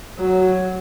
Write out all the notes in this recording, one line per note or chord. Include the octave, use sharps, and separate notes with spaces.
F#3